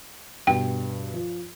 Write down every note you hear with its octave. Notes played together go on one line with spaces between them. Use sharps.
G2 B2 G5
F3